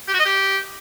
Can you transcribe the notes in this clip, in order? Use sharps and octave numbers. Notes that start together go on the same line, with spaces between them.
G4
F#4
D#5
G4